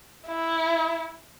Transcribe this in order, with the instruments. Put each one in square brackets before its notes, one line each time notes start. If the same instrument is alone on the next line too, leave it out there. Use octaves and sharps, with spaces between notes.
[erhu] E4